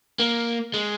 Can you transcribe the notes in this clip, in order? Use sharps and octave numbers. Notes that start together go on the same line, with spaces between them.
A#3
G#3